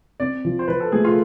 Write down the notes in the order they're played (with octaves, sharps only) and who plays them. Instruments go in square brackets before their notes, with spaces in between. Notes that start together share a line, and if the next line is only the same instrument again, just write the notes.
[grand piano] C4 [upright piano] D5
[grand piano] F3
[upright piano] C5
[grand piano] F3 [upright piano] B4
[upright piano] A4
[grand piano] A3 [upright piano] G#4
[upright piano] F4